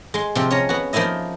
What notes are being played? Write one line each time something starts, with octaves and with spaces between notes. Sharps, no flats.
G#3 C6
C3 F3 C4
C#4 C#5 A#5
B3 F#4
F3 A#3 D#4 E4 D#5